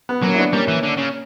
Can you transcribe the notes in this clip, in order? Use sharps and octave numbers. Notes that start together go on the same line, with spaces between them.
B3
F#3 A#3 C#4
E4
B3 D4
G3 A#3 C#4
E3
D3
C#3